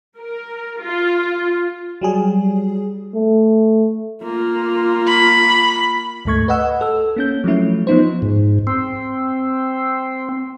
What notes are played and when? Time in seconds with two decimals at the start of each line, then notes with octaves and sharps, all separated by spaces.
0.18 A#4
0.82 F4
2.01 F#3 G3 G#4
3.15 A3
4.22 A#3 F4
5.08 B5
6.25 D2 G#2 A3 C#6 G#6
6.48 B4 D#5 F#5 E6
6.81 A4 E6
7.16 A#3 C#4 G6
7.44 F3 F#3 A3 C#4 E4
7.87 F3 B3 D#4 C5
8.22 G#2
8.67 C4